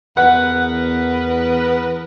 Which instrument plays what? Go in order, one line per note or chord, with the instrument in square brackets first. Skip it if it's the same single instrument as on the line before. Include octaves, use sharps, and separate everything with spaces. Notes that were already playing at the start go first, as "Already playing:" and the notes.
[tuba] E2 [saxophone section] B3 A#4 B4 [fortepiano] F#5